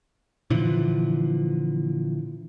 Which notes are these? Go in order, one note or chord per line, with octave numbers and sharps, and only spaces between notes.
A#2 D3 E3 F3